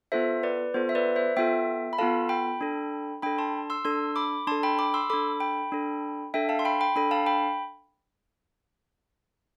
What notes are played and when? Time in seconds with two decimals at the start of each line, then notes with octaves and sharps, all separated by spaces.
0.12 B3 F4 A4 C5 E5
0.43 B4 D5
0.74 B3 F4 A4 C5
0.89 E5
0.95 B4 D5
1.16 C5 E5
1.36 B3 F4 A4 E5 G5
1.93 B5
1.98 B3 F4 A4 F5 A5
2.29 G5 B5
2.61 D4 A4
3.22 D4 A4 G5 B5
3.38 A5 C6
3.70 C6 E6
3.85 D4 A4 C6 E6
4.16 B5 D6
4.47 D4 A4 A5 C6
4.63 G5 B5
4.79 B5 D6
4.94 C6 E6
5.10 D4 A4 B5 D6
5.40 G5 B5
5.72 D4 A4
6.34 D4 A4 E5 G5
6.49 F5 A5
6.59 C6
6.65 G5 B5
6.81 G5 B5
6.96 D4 A4 G5 B5
7.11 F5 A5
7.26 G5 B5